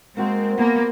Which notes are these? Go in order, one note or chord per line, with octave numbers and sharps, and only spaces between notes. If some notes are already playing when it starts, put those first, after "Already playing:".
G#3 A#3 C4 F#4 C5
A#3 B3 A#4 A5 C6